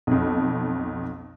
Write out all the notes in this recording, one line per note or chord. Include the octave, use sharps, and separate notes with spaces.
B1 F2